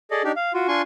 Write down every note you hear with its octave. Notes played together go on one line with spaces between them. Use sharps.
G#4 A4 D5 D#5
D4 D#4 G4
F5
F4 F#4
D4 F4 G#5 C6 C#6